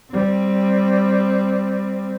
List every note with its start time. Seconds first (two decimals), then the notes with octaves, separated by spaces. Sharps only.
0.11 G3 C4